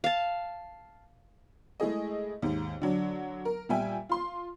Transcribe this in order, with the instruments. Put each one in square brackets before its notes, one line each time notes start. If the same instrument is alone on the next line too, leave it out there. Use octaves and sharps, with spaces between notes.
[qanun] F5 A5
[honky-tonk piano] G#3 A3 E4 G#4 D#5
D#2 G#2
D3 F#3 D4
A#4
A#2 G3 E5 G5 G#5
F4 C6